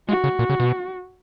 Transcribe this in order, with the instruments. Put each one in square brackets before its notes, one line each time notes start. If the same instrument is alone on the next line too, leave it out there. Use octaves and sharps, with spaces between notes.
[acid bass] G#3 [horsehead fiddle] F#4
[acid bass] C#3
A#2
C#3
B2